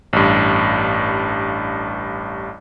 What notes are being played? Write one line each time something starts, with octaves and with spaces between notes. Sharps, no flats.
A1 G2